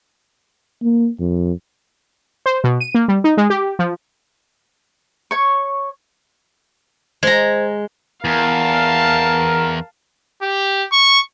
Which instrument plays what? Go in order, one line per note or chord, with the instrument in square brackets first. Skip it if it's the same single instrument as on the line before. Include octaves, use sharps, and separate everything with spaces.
[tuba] A#3
F2
[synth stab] C5
B2
D#7
A#3
G3
D#4
G#3
G4
F3
[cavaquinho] C#5 C#6
[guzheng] G#3 A#5 [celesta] C5 G#6
[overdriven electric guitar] E2 [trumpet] A#4 [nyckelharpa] F5 A5
[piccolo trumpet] G4
C#6